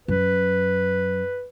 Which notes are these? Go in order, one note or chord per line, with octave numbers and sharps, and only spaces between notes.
F#2 B4